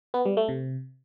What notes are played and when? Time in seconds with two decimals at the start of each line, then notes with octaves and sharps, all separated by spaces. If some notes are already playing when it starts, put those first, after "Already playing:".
0.14 B3
0.25 G3
0.37 A3
0.49 C3